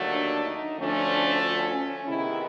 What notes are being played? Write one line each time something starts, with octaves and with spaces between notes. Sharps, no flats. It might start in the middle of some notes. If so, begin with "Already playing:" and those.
Already playing: D#2 D3 F#3 A3
D4
D#4
D2 D3 F3 A3 C#4 D4
C#4
C#4
C3 D#3 G#3 B3 E4